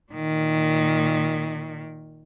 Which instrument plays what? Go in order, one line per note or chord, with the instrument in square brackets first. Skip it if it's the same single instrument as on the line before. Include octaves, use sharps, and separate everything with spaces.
[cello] A#2 D#3